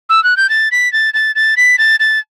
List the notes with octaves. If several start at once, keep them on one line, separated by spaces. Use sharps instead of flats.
E6
F#6
G6
A6
B6
A6
A6
A6
B6
A6
A6